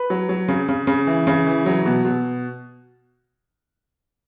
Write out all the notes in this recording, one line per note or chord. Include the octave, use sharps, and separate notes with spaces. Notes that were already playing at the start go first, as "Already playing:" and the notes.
Already playing: B4
F#3
F#3
C#3
C#3
C#3
E3
C#3
E3
F#3
B2
B2